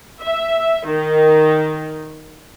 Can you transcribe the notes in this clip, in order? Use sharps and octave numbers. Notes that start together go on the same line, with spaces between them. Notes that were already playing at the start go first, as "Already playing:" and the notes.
E5
D#3